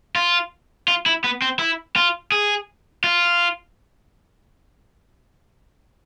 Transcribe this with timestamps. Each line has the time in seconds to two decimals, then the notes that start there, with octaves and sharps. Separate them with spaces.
0.16 F4
0.88 F4
1.06 E4
1.24 B3
1.42 C4
1.59 E4
1.96 F4
2.32 G#4
3.04 F4